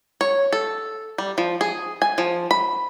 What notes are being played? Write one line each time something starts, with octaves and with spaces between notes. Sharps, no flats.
C#5
A4
G3
F3
G#4
G#5
F3
B5